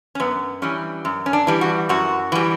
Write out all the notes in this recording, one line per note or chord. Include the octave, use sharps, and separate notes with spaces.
C#4
F#2 B3
E3 G3 C#4
F#2
C#4
D4
E3 G3
F#4
F#2 F#4
E3 G3